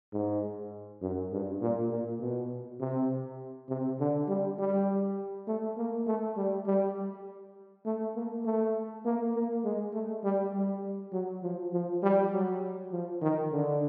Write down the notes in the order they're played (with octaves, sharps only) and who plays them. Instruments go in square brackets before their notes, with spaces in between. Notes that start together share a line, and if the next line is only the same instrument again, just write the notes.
[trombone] G#2
F#2
G2
A#2
A#2
B2
C3
C3
D3
G3
G3
A3
A#3
A3
G3
G3
A3
A#3
A3
A#3
A#3
G#3
A3
G3
G3
F#3
F3
F3
G3
F#3
F3
D#3
D3